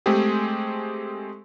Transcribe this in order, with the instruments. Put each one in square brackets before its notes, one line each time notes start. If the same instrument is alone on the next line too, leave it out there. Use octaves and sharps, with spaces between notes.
[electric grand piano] G#3 A3 C4 G4 G#4